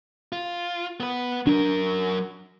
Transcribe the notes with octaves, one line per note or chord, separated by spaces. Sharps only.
F4
B3 B4
F#3 D4 A#4